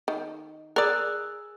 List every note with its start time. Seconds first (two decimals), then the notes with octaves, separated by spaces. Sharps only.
0.08 D#3
0.76 G#4 A#4 D5 E6 F#6